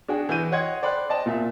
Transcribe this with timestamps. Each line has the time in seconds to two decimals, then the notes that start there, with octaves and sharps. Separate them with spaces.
0.08 D4 F#4 G#4 G5
0.29 E3 F#4 G6 D#7
0.52 C#5 D#5 F#5 G5 C6 G#6
0.82 C5 D5 G5 B5 C6 F#6
1.09 C5 D5 D#5 G5 A5
1.26 A#2 E5